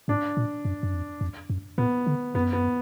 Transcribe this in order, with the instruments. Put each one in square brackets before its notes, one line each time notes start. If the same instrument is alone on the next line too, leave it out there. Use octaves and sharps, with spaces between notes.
[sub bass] G#2 [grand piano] D4
[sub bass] A#2
F#2
F#2
F2
F2
F#2
[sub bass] A#2 [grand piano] B3
[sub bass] D3
[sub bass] F#2 [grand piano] B3
[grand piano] B3